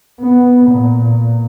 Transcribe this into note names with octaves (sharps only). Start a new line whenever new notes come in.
B3
A#2